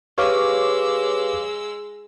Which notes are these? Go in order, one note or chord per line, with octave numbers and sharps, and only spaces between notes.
G#3 G4 B4 C#5 F5 D6 E6